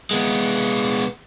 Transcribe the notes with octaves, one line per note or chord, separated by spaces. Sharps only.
G#3 B3